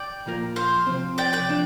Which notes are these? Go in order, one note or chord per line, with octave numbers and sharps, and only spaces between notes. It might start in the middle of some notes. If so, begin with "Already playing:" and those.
Already playing: D5 G5
A#2 F3 A#3 F4 A#4
C5 F5
C3 F3 C4
D5 G5
D5 G5
F3 D4